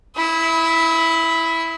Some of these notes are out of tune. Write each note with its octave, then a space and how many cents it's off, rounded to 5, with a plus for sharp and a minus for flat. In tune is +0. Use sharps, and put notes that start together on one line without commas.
E4 +0 E6 -45